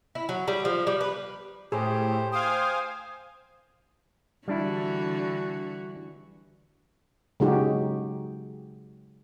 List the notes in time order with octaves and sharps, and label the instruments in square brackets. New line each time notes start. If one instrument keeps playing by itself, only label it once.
[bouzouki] E4
F#3
G3
F3
G3
B4
[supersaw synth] A2 [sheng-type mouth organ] G4 C5 [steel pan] G#4
[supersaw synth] C5 F5 G#5 [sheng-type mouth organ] G5 [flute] D#6
[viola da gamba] D3 E3 F#4 [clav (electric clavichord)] G3 D4 E4
[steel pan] C#3 F#3 G#3 D#4 F#4 G4